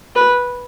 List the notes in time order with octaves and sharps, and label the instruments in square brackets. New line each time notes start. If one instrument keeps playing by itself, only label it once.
[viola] B4